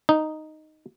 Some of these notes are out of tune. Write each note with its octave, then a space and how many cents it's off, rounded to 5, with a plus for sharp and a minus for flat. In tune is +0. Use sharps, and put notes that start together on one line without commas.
D#4 -5